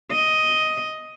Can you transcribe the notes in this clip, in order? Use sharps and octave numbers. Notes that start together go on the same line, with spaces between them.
D#5